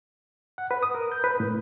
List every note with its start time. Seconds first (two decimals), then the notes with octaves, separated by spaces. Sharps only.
0.58 F#5
0.71 B4
0.83 D#6
0.95 A#4
1.12 G6
1.24 B4
1.40 A2